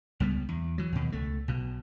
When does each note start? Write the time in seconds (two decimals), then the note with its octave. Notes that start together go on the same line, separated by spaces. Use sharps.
0.20 C#2 G3 B3
0.49 E2
0.78 E3 F#3
0.92 D#2 B2
1.12 C#2 A3
1.48 B1 B2